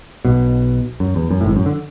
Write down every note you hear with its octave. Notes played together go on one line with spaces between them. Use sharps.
B1 B2
F#2
E2
F#2
A2
G#1 G#2
F#2
D3